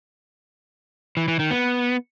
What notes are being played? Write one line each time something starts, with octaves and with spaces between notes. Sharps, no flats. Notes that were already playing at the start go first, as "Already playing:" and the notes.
E3
E3
D#3
B3